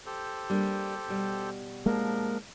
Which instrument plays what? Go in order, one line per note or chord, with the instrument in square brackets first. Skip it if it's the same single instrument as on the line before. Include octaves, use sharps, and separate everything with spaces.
[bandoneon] G4 A4 C5
[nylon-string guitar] G3 A#3 D4
B2 G3
[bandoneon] F3 D4 A#4 [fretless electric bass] G#3 A#3